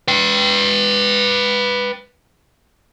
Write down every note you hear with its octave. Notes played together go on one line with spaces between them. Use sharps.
B4 G5